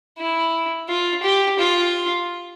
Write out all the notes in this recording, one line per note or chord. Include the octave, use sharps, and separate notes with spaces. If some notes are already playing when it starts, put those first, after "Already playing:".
E4
F4
G4
F4